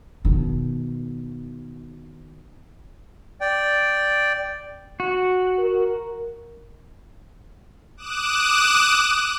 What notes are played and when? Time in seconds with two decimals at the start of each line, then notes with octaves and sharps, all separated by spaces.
0.25 B2 D#3
3.41 D5 G5
5.00 F#4
5.59 A#4
7.97 D6 D#6 F#6 E7